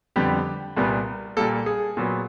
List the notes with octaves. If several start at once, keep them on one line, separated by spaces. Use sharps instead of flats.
F2 D3 G3 B3 G4
C2 A#2 G3 B3
A#2 G3 A#3 A4
G#4
A#2 F#3 B3